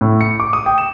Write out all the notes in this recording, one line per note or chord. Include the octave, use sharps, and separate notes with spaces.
A2
C#7
D6
D#6
G5
E7